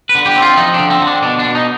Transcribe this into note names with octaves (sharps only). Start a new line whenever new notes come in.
B4
D3
G4
C4
F4
F3 D#4
D4
D3
C4
D3
D4
B2 D4
D4
B2
D#4